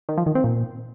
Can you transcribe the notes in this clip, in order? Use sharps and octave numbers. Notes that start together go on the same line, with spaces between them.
D#3
F3
D#3
C4
A#2